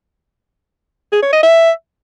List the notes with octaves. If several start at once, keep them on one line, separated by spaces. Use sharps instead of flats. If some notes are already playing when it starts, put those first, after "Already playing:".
G#4
C#5
D#5
E5